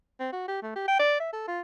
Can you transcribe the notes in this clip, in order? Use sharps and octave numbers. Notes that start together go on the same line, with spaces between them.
C4
F#4
G4
A3
G4
G5
D5
E5
A4
F4